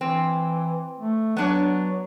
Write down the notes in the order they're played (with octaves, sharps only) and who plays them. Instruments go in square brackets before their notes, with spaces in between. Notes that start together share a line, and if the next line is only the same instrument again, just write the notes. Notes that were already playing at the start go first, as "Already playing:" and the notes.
[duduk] E3 [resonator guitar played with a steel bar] C4
[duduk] A3
[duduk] F#3 [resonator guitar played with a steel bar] B3 D4 C#5